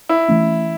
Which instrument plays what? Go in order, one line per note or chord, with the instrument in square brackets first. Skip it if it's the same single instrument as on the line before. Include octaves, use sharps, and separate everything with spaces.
[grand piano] E4
[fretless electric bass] E3 A3 C#4